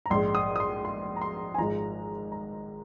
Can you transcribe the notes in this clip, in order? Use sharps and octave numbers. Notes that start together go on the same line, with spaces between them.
A#5
A#1 G#2 G#3 C6
D#6
D#6
C6
C6
A#5
C6
G#5
G#1 G#2 F3 G#3 A#5
A#5